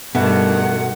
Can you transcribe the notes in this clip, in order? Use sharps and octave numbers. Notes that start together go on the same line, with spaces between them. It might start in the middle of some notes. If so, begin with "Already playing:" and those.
G2 B2 D#3 A3 F#5